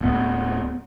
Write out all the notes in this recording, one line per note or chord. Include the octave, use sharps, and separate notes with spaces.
D1 B3